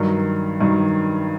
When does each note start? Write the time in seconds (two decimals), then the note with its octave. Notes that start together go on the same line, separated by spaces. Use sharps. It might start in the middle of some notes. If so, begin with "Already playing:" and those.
Already playing: G2 D#3 F#3 A#4
0.61 G2 D#3 F#3